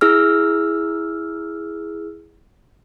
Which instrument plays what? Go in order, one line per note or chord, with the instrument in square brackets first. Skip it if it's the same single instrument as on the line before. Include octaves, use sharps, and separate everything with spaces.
[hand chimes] E4 G#4 E6 F6